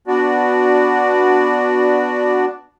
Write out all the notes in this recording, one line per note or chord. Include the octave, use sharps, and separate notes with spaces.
B3 D4 F#4 D5